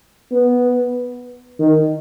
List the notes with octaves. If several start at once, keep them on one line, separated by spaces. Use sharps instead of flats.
B3
D#3